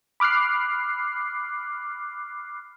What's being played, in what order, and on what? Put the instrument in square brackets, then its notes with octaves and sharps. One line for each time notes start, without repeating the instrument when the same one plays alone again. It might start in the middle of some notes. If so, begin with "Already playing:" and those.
[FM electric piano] B5 D6 F6 F#6 C7